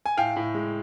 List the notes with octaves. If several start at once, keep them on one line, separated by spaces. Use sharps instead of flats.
G#5
A2 F5 G5
A2
G#3